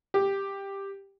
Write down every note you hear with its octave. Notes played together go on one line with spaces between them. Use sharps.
G4